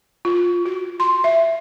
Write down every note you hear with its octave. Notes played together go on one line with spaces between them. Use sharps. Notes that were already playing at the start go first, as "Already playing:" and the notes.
F4
F#4
C6
E5